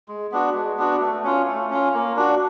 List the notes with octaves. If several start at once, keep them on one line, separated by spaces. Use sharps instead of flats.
G#3
B3 D4 F#4
G#3
B3 D4 F#4
A3
C#4 F4
A3
C#4 F4
A#3
D4 F#4